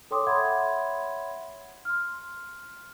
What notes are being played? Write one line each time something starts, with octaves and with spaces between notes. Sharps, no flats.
A4 C#5 G5 C6 D6 D#6
C#5 E5 F#5 B5 C6 G#6
C6 F6